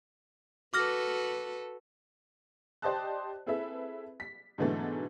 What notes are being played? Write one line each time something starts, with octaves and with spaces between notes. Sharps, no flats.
F#4 A4 B4 D6 F6 A#6
G4 C5 D5 D#5 A5 F#6
C4 E4 G#4 A4 B4 E5
B6
G#2 B2 D3 E3 F#3 A3